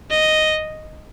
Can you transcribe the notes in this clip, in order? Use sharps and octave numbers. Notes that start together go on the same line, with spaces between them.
D#5